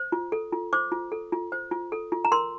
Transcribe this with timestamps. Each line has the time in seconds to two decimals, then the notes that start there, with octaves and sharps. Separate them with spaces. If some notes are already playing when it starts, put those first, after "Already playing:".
Already playing: C5
0.12 F4
0.32 A4
0.52 F4
0.73 C5 D6
0.92 F4
1.12 A4
1.32 F4
1.52 C5
1.71 F4
1.92 A4
2.12 F4
2.25 A#5
2.32 A#4 C6